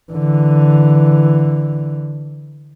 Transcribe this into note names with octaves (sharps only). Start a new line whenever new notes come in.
D3 E3